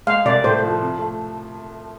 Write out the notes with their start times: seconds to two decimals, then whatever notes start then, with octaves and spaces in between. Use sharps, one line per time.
0.07 G#3 F5
0.25 C2 D5
0.44 A2 C5
0.63 F3
0.81 C3
0.98 A3